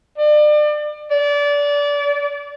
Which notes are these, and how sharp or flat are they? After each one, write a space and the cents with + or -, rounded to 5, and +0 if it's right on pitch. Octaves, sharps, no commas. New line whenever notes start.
D5 +35
D5 -25